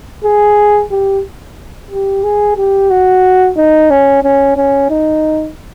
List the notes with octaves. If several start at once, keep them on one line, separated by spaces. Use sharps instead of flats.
G#4
G4
G4
G#4
G4
F#4
D#4
C#4
C#4
C#4
D#4